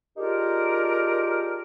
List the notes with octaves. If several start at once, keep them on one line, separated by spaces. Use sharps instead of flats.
D4 D#4 F4 G4 G#4 A#4